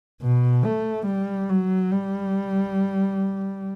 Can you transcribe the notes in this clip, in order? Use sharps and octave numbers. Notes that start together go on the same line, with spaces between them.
B2
A3
G3
F#3
G3